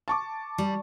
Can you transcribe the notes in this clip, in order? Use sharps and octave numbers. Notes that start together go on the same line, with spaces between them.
A5 C#6 D6
G3